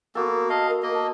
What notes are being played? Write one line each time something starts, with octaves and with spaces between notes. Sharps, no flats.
A#3 B3 F#4 A4
D#5 F5 A5
A#4
A#3 D#5
A5